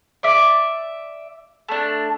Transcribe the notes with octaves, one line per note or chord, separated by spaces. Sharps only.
D5 E5
A3 D4